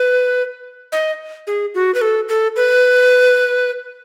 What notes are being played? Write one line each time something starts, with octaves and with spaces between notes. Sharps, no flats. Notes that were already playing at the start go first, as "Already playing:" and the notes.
Already playing: B4
D#5
G#4
F#4
B4
A4
A4
B4